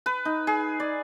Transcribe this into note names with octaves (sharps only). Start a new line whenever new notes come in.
B4
D#4
G#4
D5